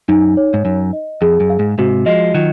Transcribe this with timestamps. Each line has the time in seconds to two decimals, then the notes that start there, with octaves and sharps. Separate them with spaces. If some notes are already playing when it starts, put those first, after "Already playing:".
0.09 F#2 D#4
0.37 C#5
0.54 G#2
0.65 F#2 D#4
0.93 D#5
1.22 F2 G#4
1.40 F#2
1.50 F5
1.59 G#2
1.78 G#2 C3 F#4
2.06 F3 G#3 D#5
2.34 D#3 F#3 F4